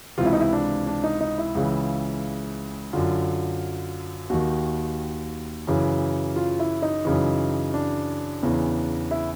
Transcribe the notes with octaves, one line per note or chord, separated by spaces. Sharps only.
C#2 C3 E3 F4
E4
D#4
E4
D4
D4
D#4
D#4
E4
C#2 C#3 E3
F#2 D3 F4
D#2 D#3 F#4
F#2 C#3 E3
F4
E4
D#4
F#2 C#3 E3
D4
E2 C#3 E3
E4